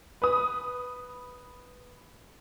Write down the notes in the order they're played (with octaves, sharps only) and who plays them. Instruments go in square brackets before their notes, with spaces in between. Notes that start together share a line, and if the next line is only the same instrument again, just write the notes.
[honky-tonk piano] B4 D#6